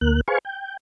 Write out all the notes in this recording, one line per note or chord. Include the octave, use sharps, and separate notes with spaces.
D2 A#3 F#6
G#4 B4 C5 F5 G#5 C#6
G5